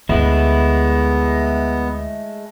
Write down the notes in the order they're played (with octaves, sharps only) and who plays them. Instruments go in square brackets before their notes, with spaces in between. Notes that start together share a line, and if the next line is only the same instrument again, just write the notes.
[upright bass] D2 [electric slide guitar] G#3 A3 E4 [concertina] B3